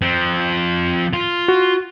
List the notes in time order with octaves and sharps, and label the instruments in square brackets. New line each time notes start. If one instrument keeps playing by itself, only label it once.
[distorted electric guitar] F3 C4
F4
[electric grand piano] F#4